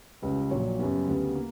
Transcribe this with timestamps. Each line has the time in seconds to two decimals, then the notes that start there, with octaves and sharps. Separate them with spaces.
0.22 C#2 C#3 G3 B4
0.51 A#1 A#2 F#3 C#5
0.79 F#2 C#3 G3 B3
1.07 D2 C#3 G3 B3
1.35 A#3